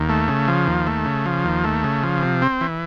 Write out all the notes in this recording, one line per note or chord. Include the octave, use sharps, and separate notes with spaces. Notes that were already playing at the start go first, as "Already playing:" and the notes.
Already playing: D#2
A3
C#3
F3
D#2
A3
C#3
F3
D#2
A3
C#3
F3
C3
C4
E3